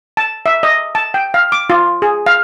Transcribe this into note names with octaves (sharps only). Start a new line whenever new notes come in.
A5
E5
D#5
A5
G5
F5
D6
F4
G#4
F5